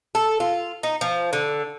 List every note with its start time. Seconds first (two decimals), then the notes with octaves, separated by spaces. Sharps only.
0.15 A4
0.40 F4
0.83 D#4
1.01 F3
1.33 D3